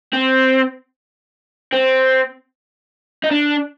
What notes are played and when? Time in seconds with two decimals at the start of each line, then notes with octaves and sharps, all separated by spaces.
0.13 C4
1.73 C4
3.24 D#4
3.31 D4